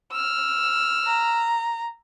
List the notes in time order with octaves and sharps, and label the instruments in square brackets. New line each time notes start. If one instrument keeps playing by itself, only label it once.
[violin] E6 F6
[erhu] A#5